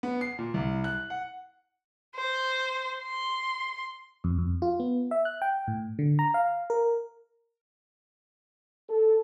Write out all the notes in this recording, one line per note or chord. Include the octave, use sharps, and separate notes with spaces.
B3
C7
A#2
C2
F#6
F#5
C5
C6
F2
F2
F4
B3
E5
F#6
G5
A2
D3
A#5
F5
A#4
A4